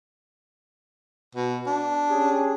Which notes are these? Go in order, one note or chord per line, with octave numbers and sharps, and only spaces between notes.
B2
D4
C#4 G4 G#4